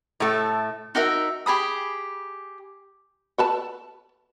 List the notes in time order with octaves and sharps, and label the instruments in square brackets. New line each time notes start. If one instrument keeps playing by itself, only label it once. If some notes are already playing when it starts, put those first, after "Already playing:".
[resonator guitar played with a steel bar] A2 A3
[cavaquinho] D#4 F#4 A#4 E5
G4 G#4 B5 D#6
[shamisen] A4 B4 A5